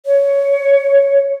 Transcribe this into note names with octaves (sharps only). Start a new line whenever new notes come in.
C#5